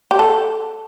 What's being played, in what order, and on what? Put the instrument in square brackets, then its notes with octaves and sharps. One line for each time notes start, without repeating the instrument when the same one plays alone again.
[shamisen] G4
A4